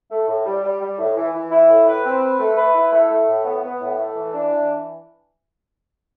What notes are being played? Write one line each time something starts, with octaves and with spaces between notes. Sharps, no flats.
A3
A2
G3
G3
G3
A2
E3
E3
E4
A2
B4
C4
B4
A3
B4
E4
A3
A3
A2
B3
B3
A2
A3
E3
D4
E3